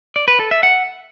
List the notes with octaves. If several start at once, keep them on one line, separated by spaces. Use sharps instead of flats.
D5
B4
A4
E5
F#5